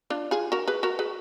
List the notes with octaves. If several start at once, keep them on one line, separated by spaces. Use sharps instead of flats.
D4 F4
F4 G#4
F#4 A#4
G#4 B4
F#4 A#4
G#4 B4